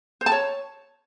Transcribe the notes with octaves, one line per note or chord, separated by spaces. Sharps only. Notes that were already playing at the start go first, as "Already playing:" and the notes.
C5
A5
C#5